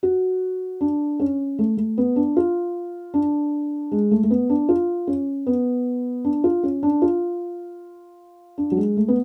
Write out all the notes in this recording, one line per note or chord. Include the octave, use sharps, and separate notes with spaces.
F#4
D4
C#4
A3
A3
B3
D4
F4
D4
G#3
A3
A3
B3
D4
F4
C#4
B3
D4
F4
C#4
D4
F4
D4
F#3
G#3
A3
B3